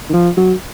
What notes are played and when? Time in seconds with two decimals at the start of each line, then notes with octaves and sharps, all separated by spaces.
0.10 D#3
0.13 F3
0.37 F#3